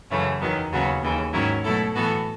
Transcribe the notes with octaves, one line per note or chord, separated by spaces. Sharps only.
F#2 C#3 E3 A3 C#4
E2 D#3 F#3 B3
D#2 C#3 F#3 B3 F#4
D#2 C#3 E3
G#2 D#3 F#3 C#4 E4
B2 F#3 A3 E4 A4
A2 E3 B3 F#4 A4